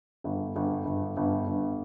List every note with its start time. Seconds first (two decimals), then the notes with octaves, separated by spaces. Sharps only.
0.24 G1
0.56 G1
0.85 G1
1.17 G1
1.47 G1